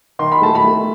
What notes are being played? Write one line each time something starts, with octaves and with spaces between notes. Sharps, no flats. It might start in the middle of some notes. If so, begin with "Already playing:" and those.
D#3 C6
B5
A3 A5
B5
A3